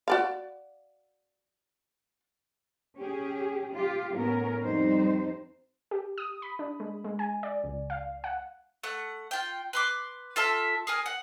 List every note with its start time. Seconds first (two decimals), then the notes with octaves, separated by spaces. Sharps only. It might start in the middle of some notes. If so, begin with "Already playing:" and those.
0.08 F#4 D5 F5
2.97 C#4 G4 G#4
3.73 F4 G4
4.14 A2 B3 C#4 A#4
4.64 F2 G3 C4 D#4 C5
5.91 G4
6.18 D#6
6.42 B5
6.59 D4
6.80 G#3
7.04 G#3
7.19 G#5
7.43 D5
7.64 C#2
7.90 F5
8.24 F#5
8.83 A3 F#5
9.31 F4 G5
9.73 B4 C6 D6
10.36 F4 A4 E5 A5
10.87 G#4 A#4 G#5
11.06 F#5